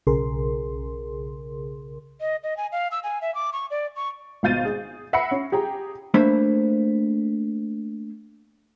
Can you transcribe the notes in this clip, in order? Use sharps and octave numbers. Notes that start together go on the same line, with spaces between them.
B1 C#3 G#4 A#4 C6
D#5
D#5
G#5
F5
E6
G#5
E5
D6
C#6
D5
C#6
G#1 B2 F5 G6 A6 D#7
G#4
E5 F#5 B5 A#6 C7 C#7
C#4
G4 G#4 G5 A#5
A3 A#3 D4 C5 E5 B5